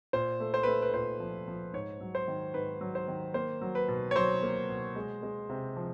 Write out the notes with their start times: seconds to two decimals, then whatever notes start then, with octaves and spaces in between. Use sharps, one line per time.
0.13 A#2 C5
0.40 A3
0.54 C5
0.63 A3 B4
0.82 B4
0.94 A#2 C5
1.20 F3
1.48 F3
1.73 G#2 C#5
2.01 F#3
2.15 C5
2.28 D#3
2.54 G#2 B4
2.81 F#3
2.95 C5
3.08 D#3
3.34 A#3 C5
3.61 F#3
3.75 B4
3.88 B2
4.11 C#5
4.16 F#3 C5
4.43 A#3
4.69 B2
4.96 G#3
5.23 G#3
5.50 C3
5.76 F3